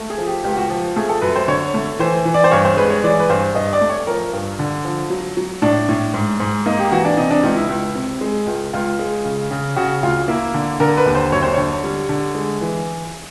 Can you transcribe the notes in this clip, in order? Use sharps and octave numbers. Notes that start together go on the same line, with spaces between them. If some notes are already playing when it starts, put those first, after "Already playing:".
Already playing: A3
G#4
F3
G4
C#2 G4
F#4
G4
F3
A3 G#4
A4
F#2 B4
C5
D3 C#5
A3
E3 C5
E3
D5
C5
G2 C#5
C5
G#3 B4
C#5
E3 D5
B4
G2 C5
G2 D#5
D5
A3
C#5
F3 A#4
G2
D3
F3
F#3
F#3
A2 D4
A2
G#2
G#2
A#3 D#4
G4
E3 F#4
D4
C3 D#4
D4
C#2 D#4
E4
C#2
C3
G#3
C#2
C#2 F4
G#3
C#3
C#3
C#3 F#4
D2 F4
A#3 E4
D3
D3 A#4
B4
D#2
C5
F#2 C#5
C5
D3 C#5
G3
D3
G#3
E3